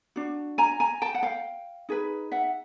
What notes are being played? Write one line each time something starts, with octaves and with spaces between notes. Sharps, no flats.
D4 F#4
G#5 A#5
G#5 A#5
G5 A5
F#5
F5 G5
D#4 G#4 B4
E5 F#5